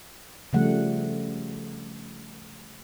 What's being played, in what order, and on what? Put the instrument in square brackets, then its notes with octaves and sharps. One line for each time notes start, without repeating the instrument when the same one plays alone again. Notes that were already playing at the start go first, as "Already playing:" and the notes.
[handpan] C#3 F3 G3 A3 F#5